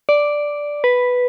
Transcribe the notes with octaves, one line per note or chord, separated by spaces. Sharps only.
D5
B4